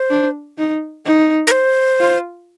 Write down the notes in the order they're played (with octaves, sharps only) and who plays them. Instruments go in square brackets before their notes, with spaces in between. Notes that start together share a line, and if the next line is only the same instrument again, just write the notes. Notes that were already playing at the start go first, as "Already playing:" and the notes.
Already playing: [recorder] C5
[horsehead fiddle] D4
D#4
D#4
[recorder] A#4
C5
[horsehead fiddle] F4